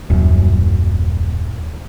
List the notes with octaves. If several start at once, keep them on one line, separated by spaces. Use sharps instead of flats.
D#1 F#2